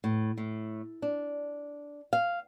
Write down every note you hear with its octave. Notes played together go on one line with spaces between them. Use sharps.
A2
A2
D4
F5